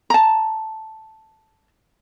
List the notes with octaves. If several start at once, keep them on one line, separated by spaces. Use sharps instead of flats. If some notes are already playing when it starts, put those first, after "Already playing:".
A5 A#5